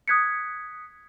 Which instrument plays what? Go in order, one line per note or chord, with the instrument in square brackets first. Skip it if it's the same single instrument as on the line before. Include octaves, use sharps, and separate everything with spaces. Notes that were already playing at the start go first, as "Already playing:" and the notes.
[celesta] D#6 F#6 G#6 B6 C#7